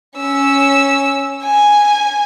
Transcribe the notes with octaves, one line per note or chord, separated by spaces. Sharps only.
C#4 E6
G#5